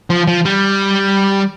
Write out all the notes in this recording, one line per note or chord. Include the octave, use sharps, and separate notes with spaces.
F3
F3
G3